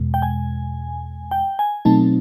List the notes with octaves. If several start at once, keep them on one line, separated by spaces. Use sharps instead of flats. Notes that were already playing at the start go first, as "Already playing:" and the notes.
Already playing: E2 B2 G#3
G5
G#5
G5
G#5
B2 F#3 A3 C4 D#4 A5